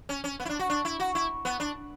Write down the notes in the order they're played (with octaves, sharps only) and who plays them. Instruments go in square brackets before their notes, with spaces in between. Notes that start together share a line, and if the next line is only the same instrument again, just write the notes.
[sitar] C#4
C#4
B3
E4
D4
F#4
D4
E4
F#4
E4
B3
D4